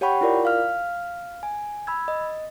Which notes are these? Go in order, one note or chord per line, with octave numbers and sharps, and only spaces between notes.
G4 C#5 F#5 G5 B5 C#6
E4 F4 A#4 D5
F5 F6
G#5
B5 E6 G#6
D#5